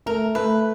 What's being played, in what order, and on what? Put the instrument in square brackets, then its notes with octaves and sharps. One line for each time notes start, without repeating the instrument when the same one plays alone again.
[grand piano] A3 [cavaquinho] A#4
[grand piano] A3 [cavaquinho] B4